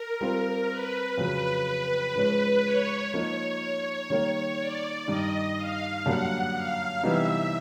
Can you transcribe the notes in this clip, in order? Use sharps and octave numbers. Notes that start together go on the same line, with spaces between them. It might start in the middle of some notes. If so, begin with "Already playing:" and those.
Already playing: A#4
G3 C4 F4
B4
F2 C#3 F#3 B4
G#2 F3 G#3 C#4
C#5
F3 A#3 D#4 C#5
D#3 G3 A#3
D5
G2 D#3 G3 D#5
F5
F#2 D3 G3 A#3 F#5
F5
C3 E3 G3 B3 D#4 E5